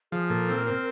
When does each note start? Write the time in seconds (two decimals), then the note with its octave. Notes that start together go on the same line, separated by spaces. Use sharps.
0.12 F3 G#4
0.30 A#2 A4
0.49 C4
0.57 A#4
0.67 C4